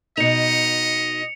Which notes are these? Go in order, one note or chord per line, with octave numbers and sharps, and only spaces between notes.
B2 D#4 D#5 C#7 F7